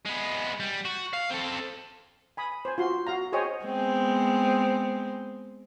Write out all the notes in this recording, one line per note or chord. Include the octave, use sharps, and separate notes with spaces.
G#3 B3
G3
F#4
F5
C4 A4
G#5 B5 D#6
C5 G#5
F4 F#4 C6
F#4 F5 A#5
G#4 C5 C#5 D#5 G5 G#5
G#3 B3 C4